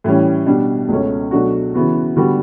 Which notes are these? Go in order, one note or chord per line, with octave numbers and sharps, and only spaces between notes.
A2 E3 G3 C#4
B2 G3 D4
C#2 B2 A3 C#4
B2 F#3 A3 D4 F#4
C#3 E3 B3 F#4
D3 G3 B3 F#4